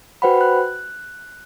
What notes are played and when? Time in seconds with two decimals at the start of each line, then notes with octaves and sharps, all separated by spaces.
0.22 F#4 B4 C5 F#5 G5 B5
0.41 F#6